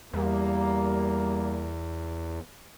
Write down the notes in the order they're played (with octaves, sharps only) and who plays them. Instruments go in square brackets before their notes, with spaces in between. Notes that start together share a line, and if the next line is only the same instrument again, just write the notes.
[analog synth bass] E2 [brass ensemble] G3 A#3